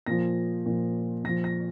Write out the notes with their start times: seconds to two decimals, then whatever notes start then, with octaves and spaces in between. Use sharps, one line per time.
0.06 A#2 F3 A#6
0.66 A#2 F3
1.24 A#2 F3 A#6
1.44 A#6